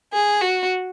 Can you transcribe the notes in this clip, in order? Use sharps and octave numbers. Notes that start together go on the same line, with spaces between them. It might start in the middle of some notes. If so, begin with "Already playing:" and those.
G#4
F#4